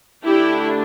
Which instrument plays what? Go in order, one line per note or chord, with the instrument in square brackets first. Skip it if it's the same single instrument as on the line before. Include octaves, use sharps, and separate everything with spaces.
[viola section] D3 A3 D4 E4 G4